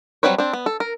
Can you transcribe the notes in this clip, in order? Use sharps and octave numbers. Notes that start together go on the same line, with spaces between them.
F#3 G3 C4 B4 C#5
C4 D4
B3
A4
A#4